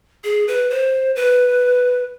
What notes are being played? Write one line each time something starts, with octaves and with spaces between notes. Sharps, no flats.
G#4
B4
C5
B4